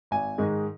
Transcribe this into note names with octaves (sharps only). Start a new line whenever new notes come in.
G#1 G#5
G#2 D#3 G#3 D#4